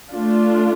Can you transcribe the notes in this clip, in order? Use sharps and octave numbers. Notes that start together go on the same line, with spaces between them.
A3 D4 F4